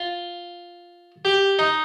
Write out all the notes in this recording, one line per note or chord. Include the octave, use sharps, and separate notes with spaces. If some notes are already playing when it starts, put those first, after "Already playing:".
Already playing: F4
G4
D#4